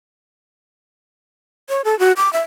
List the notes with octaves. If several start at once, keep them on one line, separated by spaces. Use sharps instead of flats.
C#5
A4
F#4
D6
E5